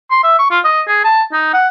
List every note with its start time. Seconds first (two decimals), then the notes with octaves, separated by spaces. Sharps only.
0.11 C6
0.23 E5
0.39 C#6
0.50 F4
0.64 D#5
0.87 G#4
1.04 A5
1.33 D#4
1.53 F#5